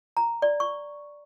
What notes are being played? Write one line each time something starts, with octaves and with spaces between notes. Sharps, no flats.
A#5
D5
C#6